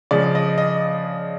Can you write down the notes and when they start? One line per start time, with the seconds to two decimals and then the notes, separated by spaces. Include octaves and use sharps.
0.11 C#3 F3 G#3 D5
0.35 D#5
0.58 D#5